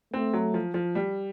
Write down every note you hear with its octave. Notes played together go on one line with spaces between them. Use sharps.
A3 C4
F#3
F3
F3
G3